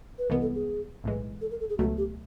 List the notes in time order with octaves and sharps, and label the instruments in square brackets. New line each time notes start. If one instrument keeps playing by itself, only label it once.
[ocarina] B4
[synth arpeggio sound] C2 C3 E3 G#3 B3 [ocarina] A#4
[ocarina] A4
G#4
[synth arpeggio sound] B1 A2 E3 G#3
[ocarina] A4
A#4
A4
G#4
[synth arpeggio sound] C#2 B2 F#3 A3 [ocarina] F#4
[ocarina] G4